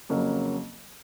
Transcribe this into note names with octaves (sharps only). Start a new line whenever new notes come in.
F2 C#3 F#3 A#3